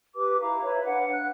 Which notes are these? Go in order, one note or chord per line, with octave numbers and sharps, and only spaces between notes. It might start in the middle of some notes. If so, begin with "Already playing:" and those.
G4 B4 D6
E4 F5 A#5
B4 C#5 E5
D4 B4 F5 F#5
F#6